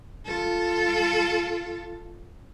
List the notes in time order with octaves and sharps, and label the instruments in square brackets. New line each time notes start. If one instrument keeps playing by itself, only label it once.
[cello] F4 A4